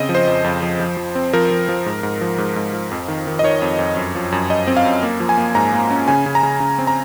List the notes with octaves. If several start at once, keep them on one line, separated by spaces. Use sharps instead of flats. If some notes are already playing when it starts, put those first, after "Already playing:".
Already playing: C#3 C4 D#5
F3
C5
F2
F2
F3
F3
F3
C4
F3 A#4
F3
F3
G#2
G#2
F3
G#2
G#2
F3
F2
D#3
D#3
D#5
D#3 C#5
F2
F2
F#2
F3
F#2
F#2 D#5
C4
F5
F#2
A#3
F3
G#5
A#3
G#2 A#5
A#3
C#4
C#3 G#5
C#3
A#5
C#3
C#3
C4
A#5